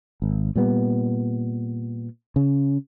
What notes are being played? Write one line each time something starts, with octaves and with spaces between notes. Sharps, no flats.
G#1
A#2 G3 B3
C#3